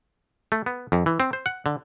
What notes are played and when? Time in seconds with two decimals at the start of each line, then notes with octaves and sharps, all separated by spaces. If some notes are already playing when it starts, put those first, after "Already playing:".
0.52 A3
0.66 B3
0.92 F2
1.06 E3
1.20 C4
1.33 C5
1.46 F#5
1.66 D3